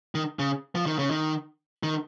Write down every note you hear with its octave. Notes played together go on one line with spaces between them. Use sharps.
D#3
C#3
F3
D#3
C#3
D#3
D#3